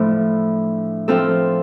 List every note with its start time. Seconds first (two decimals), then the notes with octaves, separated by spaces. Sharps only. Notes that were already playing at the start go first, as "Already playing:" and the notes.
Already playing: A2 F3 A3 D4
1.08 F3 C4 F4 A4